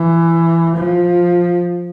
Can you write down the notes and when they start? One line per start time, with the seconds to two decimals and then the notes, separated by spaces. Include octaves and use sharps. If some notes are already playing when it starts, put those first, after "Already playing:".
Already playing: E3
0.76 F3